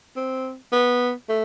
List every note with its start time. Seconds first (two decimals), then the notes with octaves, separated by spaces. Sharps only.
0.16 C4
0.72 B3
1.29 A3